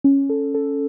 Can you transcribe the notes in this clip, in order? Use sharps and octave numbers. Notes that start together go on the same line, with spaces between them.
C#4
A4
A4